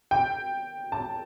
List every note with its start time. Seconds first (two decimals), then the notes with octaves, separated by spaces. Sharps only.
0.11 G5
0.92 A5